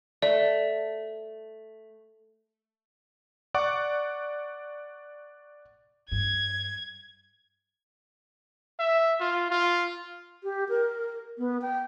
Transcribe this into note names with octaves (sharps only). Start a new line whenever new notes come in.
A3 D5
D5 F#5 C#6 D6
G2 G#6
E5
F4
F4
G4
A#4
B3
G5